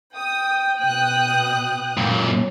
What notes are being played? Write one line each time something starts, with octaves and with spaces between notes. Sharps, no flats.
G5 D#6
B2 D#6 F#6
F#2 A#2